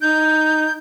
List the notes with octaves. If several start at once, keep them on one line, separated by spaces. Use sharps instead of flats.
D#4 G6